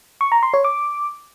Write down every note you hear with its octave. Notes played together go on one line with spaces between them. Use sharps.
C#6
A#5
C6
C#5
D6